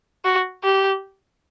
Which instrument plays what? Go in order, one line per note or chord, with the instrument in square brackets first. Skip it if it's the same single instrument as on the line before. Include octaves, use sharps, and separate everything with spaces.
[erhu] F#4
G4